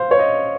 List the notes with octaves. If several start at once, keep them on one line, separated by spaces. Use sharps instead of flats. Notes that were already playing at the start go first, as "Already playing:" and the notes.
Already playing: C5 F5
C#5
D#5